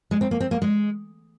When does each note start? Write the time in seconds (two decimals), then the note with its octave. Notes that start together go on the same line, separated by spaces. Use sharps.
0.11 G#3
0.21 C4
0.31 A#3
0.40 C4
0.51 A#3
0.62 G#3